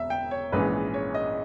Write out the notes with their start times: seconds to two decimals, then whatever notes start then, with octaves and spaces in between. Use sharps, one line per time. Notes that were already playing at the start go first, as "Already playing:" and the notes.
Already playing: E1 E5
0.10 G5
0.31 C#5
0.52 A#1 G#2 E3 G#3 C#4 B4
0.94 C#5
1.14 D#5